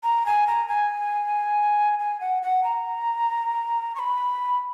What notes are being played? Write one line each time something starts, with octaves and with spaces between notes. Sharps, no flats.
A#5
G#5
A#5
G#5
G#5
F#5
F#5
A#5
C#6
B5